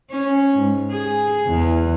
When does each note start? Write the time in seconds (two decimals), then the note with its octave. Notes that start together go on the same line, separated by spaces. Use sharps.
0.10 C#4
0.54 G#2
0.92 G#4
1.47 E2